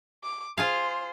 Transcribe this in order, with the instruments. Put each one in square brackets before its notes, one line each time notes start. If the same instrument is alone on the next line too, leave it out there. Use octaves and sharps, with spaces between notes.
[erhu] D6
[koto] F4 G#4 F5 [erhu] C5